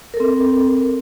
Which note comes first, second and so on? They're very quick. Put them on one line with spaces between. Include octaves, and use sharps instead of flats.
A#4 A4 C4